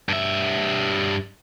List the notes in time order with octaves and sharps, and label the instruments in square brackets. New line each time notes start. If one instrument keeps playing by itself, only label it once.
[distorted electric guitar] G2 E5